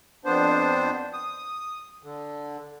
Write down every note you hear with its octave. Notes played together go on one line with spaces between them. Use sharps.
F2 B3 D4 C5
D#6
D3